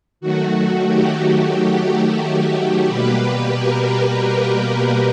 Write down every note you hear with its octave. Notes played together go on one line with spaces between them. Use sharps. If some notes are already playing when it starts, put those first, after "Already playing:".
D#3 F#3 A3 F#4
G4
B2 G3 A#3 B4
A#4
A#4